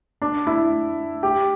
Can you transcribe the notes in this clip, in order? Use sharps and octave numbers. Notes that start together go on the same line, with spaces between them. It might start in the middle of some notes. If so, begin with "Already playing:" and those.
D4
E4
G4